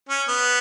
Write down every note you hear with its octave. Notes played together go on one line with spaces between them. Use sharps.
C#4
B3